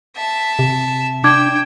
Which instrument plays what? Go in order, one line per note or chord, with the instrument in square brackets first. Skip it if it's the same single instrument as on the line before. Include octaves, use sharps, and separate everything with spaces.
[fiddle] E5 A5
[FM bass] C3
[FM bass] D4 [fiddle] G5 E6 [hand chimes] D6 G#6